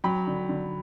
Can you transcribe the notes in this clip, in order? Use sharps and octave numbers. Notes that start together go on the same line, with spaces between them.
F#3 G5 B5
D3
D3